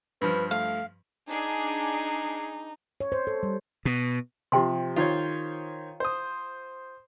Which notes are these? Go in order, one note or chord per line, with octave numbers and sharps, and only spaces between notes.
G2 F3 B4
A3 F5
D4 D#4 G#4
C#5
C5
A4
G3
B2
C3 F3 G4 G5 C6
D#3 F4 C5 C#5
C5 D#6